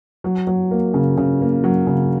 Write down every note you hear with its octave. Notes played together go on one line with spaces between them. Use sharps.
F#3
F#3
A#3
C#3
C#3
A#3
F#3
C#3